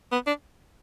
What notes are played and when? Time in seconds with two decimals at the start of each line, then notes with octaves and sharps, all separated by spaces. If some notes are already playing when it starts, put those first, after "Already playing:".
0.12 B3
0.27 D4